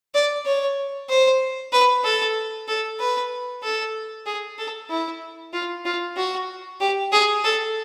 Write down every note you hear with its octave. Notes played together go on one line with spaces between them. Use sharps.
D5
C#5
C5
B4
A4
A4
B4
A4
G#4
A4
E4
F4
F4
F#4
G4
G#4
A4